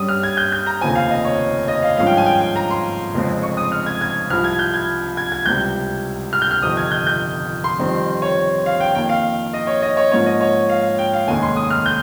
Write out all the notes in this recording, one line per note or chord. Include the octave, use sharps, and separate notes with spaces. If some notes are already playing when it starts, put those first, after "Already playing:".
Already playing: G2 G3 C#4 D#6
F6
G#6
G6
G6
A#5
F1 D#2 C#3 F3 C4 G#5
F5
D#5
C#5
D#5
F5
G#1 G2 F3 G#3 C#4 F5
G5
G#5
G5
G5
A#5
C6
F1 F2 C#3 G#3 C4
C#6
D#6
F6
G#6
G#6
C2 C3 F3 F6
G#6
G6
G#6
G#6
G#6
C#2 C3 G3 G6
F6
G6
F6
G1 F2 C3 D#3 D#6
G#6
G6
G6
C6
F2 D#3 G3 C4
C#5
F5
G5
F2 D#3 A#3 G5
F5
D#5
C#5
D#5
C#5
G#2 F3 A#3 C#4 C#5
D#5
C#5
F5
G5
F5
F1 D#2 D#3 G#3 C#4 G#5
C6
D#6
F6
G6